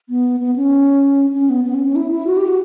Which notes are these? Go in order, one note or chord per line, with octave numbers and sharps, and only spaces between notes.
B3
B3
C#4
C#4
B3
B3
C#4
C#4
E4
E4
F#4
G4
F#4